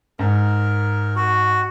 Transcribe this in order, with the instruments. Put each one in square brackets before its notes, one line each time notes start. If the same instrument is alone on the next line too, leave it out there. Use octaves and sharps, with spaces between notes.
[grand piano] G#2 [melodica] A#4
[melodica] F#4